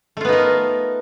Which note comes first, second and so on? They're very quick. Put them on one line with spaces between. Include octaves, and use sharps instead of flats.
A3 F4 B3 D#4 A#4